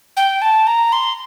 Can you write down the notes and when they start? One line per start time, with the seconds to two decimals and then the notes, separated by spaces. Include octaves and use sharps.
0.17 G5
0.42 A5
0.67 A#5
0.92 C6